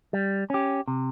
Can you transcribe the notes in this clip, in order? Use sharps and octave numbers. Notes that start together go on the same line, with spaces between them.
G3
C#4 G4
C3